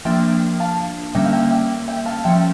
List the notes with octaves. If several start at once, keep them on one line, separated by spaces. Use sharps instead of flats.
F3 A#3 D4 E5 G5
F5 A5
D3 G3 A#3 C#4 E5 G5
F5
E5 G5
E5 G5
E5 G5
F5 A5
F3 A3 C#4 E5 G5